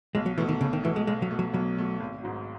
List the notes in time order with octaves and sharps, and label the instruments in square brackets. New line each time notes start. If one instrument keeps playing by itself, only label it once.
[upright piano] B1 [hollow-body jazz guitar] G#3
[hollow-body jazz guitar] F#3
[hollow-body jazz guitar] E3 [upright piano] A3
[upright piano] B2
[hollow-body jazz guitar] D#3
[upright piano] B1 [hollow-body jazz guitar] C#3
[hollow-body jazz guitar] D#3
[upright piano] B2 A3 [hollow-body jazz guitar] E3
[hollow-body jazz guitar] G#3
[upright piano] B1 [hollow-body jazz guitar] G#3
[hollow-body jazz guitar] F#3
[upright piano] B2 A3
[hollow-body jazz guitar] F#3
[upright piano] B1 [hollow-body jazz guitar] F#3
[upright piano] B2 A3
G#1
G#2 F#3